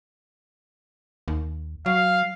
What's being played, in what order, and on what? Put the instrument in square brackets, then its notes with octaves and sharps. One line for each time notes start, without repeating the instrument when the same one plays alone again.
[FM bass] D#2
[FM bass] F#3 [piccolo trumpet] F5